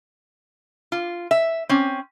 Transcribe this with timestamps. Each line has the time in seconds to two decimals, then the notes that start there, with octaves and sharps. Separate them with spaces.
0.92 F4
1.31 E5
1.69 C4 C#4